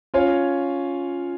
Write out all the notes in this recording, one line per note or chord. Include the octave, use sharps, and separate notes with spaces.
C#4 F4 C#5 F5